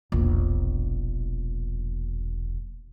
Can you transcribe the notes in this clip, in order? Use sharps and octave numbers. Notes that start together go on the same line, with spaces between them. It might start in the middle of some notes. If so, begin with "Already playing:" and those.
E1 A#1